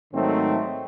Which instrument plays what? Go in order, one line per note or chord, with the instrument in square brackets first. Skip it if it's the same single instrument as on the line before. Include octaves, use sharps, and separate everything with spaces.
[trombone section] G#2 D#3 F#3 A3 C4